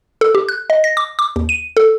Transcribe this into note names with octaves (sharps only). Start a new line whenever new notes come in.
A4
G4
F#6
D#5
A#6
D6
D6
D#2
D#7
A4